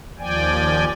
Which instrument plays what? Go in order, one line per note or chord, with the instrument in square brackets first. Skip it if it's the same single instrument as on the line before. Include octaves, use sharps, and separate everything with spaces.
[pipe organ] D#2 F3 D5 G5 G#5